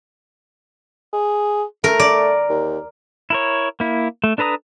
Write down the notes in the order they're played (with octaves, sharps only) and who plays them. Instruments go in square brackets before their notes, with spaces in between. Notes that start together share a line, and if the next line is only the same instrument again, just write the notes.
[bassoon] G#4
[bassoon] A3 [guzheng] A#4
[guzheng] D5
[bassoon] D#2
[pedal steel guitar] E4 A#4 C#5
A#3 E4
A3
D4 A4 B4 A#5 D#6